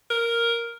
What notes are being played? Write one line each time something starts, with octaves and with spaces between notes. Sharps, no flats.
A#4